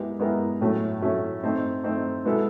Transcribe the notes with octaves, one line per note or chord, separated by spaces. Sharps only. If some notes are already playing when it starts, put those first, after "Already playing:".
Already playing: G#3 B3 E4 G4 A#4
G#3 B3 E4 G4 A#4
A2 F#3 A3 C#4
A2 F#3 A3 C#4
A3 C4 D#4
A3 C4 D#4
B2 G#3 B3 E4 A4